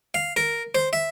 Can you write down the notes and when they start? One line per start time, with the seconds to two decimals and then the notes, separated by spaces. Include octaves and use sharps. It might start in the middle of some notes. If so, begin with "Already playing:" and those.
0.14 F5
0.37 A#4
0.75 C5
0.93 E5